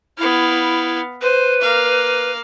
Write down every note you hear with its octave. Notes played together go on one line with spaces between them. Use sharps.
B3 E4 F5
B4 C5
A#3 F5